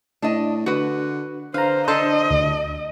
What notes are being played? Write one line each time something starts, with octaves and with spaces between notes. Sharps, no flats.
A2 D4 D#5
D3 F#4 B4
D3 B4 C5 F5 A#5
D4 A4 C5 D#5
D2